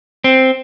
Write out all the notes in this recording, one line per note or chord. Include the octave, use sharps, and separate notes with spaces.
C4